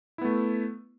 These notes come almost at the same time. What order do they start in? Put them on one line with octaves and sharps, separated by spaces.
E4 B3 A3